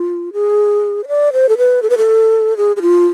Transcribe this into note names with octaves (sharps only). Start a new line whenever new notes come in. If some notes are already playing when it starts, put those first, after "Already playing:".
Already playing: F4
G#4
C5
D5
C5
A4
B4
A4
B4
A4
G#4
G#4
F4